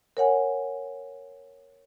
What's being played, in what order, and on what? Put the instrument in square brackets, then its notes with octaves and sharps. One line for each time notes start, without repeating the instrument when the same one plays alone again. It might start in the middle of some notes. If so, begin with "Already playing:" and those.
[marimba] A#4 C#5 F#5 G#5